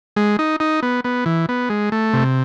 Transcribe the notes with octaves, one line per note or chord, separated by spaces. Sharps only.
G#3
D#4
D#4
B3
B3
E3
B3
G#3
A3
C3